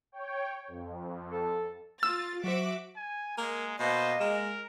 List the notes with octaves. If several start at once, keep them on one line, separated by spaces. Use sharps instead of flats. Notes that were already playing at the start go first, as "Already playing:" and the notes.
C#5 G5
F2
A4
F4 E6 A6
F#3 F#4 C5 E5 D6
G#5
G#3 A#3
B2 A#3 C5 D#5
G#3 A#4